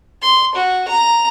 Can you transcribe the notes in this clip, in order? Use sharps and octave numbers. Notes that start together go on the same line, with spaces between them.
C6
F#4
A#5